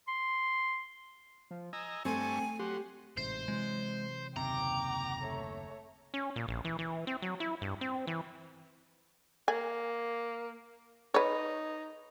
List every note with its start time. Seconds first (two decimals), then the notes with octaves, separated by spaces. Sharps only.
0.08 C6
1.51 F3
1.73 D#5 G#5 A#5 E6
2.05 G2 A3 C4 A4 G#5 C#6
2.59 F#3 G4 F#5 C6
3.17 A1 G#2 C3 C5
3.48 C3 E3 F#3 G#3
4.37 F#1 D#2 C3 G5 A#5 D6
5.22 A3 C#5
6.14 C#4
6.36 A#2
6.48 A#1
6.65 E3
6.79 E3
7.07 C4
7.22 F#3
7.40 E4
7.62 G2
7.81 C4
8.07 E3
9.48 A#3 G#5
11.14 D#4 B4 C#5